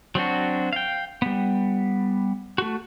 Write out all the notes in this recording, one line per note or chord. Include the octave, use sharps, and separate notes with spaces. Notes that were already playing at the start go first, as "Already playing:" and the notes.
F#3 C4 D4 F#4
F5 G5
G3 B3
A3 F#4